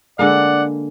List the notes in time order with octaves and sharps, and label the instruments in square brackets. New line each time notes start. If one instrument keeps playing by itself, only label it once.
[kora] D3 G#3 A#3 [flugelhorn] D5 [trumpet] F#5